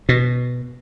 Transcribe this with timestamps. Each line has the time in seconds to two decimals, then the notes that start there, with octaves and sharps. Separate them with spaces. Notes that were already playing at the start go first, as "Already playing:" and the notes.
0.09 B2